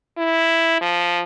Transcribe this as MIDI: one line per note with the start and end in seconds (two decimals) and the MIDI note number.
0.18 0.79 64
0.81 1.22 53